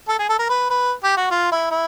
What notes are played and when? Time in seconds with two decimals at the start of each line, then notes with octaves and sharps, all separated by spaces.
0.08 A4
0.19 G#4
0.29 A4
0.39 A#4
0.49 B4
0.70 B4
1.04 G4
1.17 F#4
1.31 F4
1.52 E4
1.71 E4